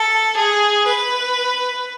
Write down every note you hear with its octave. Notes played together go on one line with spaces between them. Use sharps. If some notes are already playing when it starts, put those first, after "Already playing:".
Already playing: A4
G#4
B4